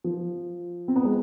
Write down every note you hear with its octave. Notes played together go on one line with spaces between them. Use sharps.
F3
C4
B3
G#3